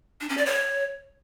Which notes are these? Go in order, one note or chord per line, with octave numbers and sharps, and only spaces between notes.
D4
C#4
D5
C#5